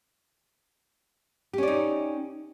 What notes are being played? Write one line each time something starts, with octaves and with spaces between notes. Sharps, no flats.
C#4 D#4 G4 D5